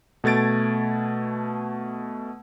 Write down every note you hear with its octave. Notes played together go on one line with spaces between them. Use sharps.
B2 A3 G#6 A6 D7